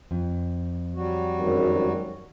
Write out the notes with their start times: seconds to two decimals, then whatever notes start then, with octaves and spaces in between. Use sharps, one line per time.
0.11 F2
0.94 F#3 G3 F#4
1.40 G#1 F#2